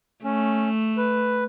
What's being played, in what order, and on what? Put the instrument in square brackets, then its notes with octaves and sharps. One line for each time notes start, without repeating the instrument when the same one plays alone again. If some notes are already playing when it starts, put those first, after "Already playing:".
[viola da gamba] A3 [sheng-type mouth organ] C#4
[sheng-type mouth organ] B4